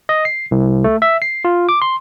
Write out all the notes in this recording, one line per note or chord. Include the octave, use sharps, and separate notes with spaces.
D#5
C7
C2
A3
E5
C7
F4
D6
C6